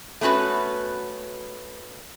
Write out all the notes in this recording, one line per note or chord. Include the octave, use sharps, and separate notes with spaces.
A3 B3 C#4 F#4 B4